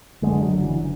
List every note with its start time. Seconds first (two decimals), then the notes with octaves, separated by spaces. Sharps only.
0.22 F#1 F#2 D3 G#3
0.43 F#3
0.63 E3